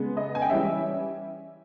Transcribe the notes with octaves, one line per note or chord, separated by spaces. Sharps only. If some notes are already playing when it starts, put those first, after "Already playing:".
Already playing: C#3 G#3 B3
D#5
G#5
G5
E3 G3 C#4 E5